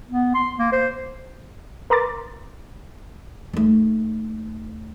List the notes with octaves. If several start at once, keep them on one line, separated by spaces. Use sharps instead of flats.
B3
C6
A#3
C5
A#4 B4 A#5 C6 D6 A6
D#2 A3